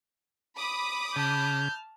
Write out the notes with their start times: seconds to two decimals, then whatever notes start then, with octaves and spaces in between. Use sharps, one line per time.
0.56 B5 D6 D#6
1.16 C#3 A5 F6 G6